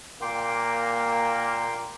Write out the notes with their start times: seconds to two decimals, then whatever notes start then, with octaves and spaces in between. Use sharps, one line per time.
0.22 A#2 A#3 G5 C6 D6